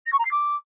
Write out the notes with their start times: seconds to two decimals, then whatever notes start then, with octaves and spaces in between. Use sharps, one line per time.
0.06 A#6
0.12 C#6
0.18 A#5
0.25 C7
0.31 D6